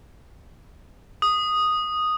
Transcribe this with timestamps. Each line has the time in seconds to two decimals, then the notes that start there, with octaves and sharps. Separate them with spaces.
1.22 D#6